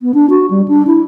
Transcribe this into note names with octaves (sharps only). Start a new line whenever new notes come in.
B3
D4
F#4
G3
D4
E4